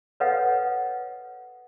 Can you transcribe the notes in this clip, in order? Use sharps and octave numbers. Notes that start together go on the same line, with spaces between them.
A4 B4 C#5 D#5 F5 F#5